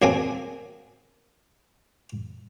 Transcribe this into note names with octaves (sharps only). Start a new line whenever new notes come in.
D2 F#3 A#3 C4 G#4 G#5